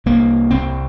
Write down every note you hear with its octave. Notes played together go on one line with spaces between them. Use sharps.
C2 A#3
C2 C4